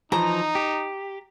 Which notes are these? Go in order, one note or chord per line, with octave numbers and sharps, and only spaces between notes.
E3 F3 D#4 A#5
G4